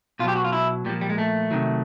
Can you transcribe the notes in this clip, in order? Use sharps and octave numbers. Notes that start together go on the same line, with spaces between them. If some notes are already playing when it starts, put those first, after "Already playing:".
B2 F#3 F4 G4
F#4
F4
E4
A#2 F3 G3
G3
G#3
A3
C3 D#3 F#3